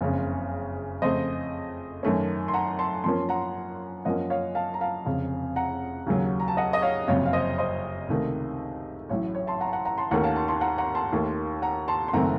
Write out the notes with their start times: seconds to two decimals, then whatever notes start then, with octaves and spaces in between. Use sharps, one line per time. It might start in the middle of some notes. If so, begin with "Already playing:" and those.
0.01 F#1 F2 C#3 C#5
1.02 F2 C#3 A3 C5 D#5
2.03 F#2 D#3 A3 C#4
2.48 C6
2.54 F#5 A#5
2.79 A5 C6
3.04 F#2 F3 A#3 C#4 A5 C6
3.29 F#5 A#5
4.05 F#2 F3 A#3 C#4 D#5 F#5
4.30 C#5 F5
4.55 F5 A5
4.74 A#5
4.81 F5 A5
5.06 F1 F2 C#3
5.56 F#5 A#5
6.06 D#2 C#3 F#3
6.40 A#5
6.48 A5
6.57 D#5 F#5
6.73 D#5
6.82 C#5 F5
7.07 F#1 F2 C3 F#3 C#5 F5
7.26 F5
7.33 C5 D#5
7.58 C5 D#5
8.08 C#2 C3 D#3 A3
9.09 A1 A2 F#3 C#5
9.35 C#5
9.47 A5 C6
9.61 F#5 A#5
9.68 A5
9.73 F#5 A#5
9.85 F#5 A#5
9.98 A5 C6
10.11 D#2 D#3 A3 C#4 F#5 A#5
10.24 F5 A5
10.36 A5 C6
10.48 A5 C6
10.61 F#5 A#5
10.78 F#5 A#5
10.95 A5 C6
11.12 D#2 D#3 A3
11.62 F#5 A#5
11.88 A5 C6
12.08 C6
12.13 F#1 F#2 D#3 A3 C4 F#5 A#5